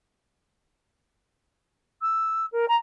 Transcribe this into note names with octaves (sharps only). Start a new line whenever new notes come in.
E6
A#4
A#5